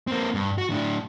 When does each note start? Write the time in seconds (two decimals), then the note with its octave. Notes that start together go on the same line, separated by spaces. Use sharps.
0.07 A#3 C4
0.34 G2
0.58 F#4
0.70 A2 D4